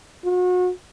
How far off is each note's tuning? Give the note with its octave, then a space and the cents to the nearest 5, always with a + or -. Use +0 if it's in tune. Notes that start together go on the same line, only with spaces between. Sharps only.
F#4 -35